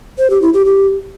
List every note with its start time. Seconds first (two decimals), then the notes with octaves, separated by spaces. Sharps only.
0.18 C5
0.30 G4
0.42 E4
0.54 G4
0.65 G4